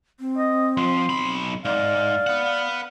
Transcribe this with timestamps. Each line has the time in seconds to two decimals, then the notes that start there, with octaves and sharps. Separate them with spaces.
0.20 C4
0.38 D#5
0.77 F3 C6
1.09 B1 B5
1.65 G#2 D5 F5
2.27 B4 F#5